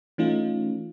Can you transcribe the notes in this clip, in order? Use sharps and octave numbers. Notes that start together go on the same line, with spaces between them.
E3 A3 C#4 D#4 F4